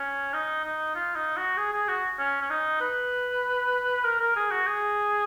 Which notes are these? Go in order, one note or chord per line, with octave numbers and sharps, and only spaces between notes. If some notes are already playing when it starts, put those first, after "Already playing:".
Already playing: C#4
D#4
D#4
F4
D#4
F#4
G#4
G#4
F#4
C#4
C#4
D#4
B4
A#4
A#4
G#4
F#4
G#4